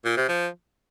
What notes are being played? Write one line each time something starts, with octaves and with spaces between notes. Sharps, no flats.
A#2
C3
F3